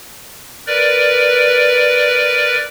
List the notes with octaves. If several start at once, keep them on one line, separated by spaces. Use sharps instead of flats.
A#4 B4 D5